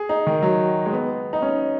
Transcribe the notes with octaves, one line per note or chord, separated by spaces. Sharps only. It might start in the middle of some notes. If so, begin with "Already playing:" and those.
Already playing: G#4
D#4
D#3
F#3
G#3
B3
D#4
C#4